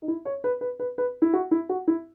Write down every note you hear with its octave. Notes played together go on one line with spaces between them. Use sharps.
D#4
E4
C#5
B4
B4
B4
B4
E4
F#4
E4
F#4
E4